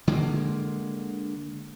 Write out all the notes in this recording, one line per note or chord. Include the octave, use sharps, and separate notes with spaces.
D3 G#3 A#3